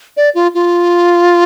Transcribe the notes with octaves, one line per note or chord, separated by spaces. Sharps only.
D5
F4
F4